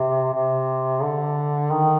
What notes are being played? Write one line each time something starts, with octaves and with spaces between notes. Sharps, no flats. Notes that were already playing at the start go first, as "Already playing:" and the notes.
Already playing: C3
C3
D3
D#3